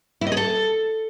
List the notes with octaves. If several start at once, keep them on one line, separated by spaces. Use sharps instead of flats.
E4
D#5
G#4
A4